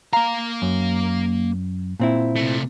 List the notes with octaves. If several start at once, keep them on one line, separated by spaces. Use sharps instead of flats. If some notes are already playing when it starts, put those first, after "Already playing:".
A#3 F5 A#5
F#2
A#2 C4 E4
C3 A3